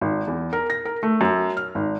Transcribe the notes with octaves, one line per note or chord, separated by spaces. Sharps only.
G#1
E2
A#4
A#6
A#4
A3
F#2
F6
G#1